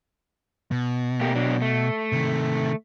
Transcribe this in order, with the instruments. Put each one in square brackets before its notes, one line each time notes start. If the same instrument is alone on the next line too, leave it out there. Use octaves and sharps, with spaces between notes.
[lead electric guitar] B2
[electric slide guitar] A3 A#3 G4
F#3 D4
A3
[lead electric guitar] C3 D#3